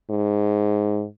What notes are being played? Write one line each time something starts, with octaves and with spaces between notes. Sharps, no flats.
G#2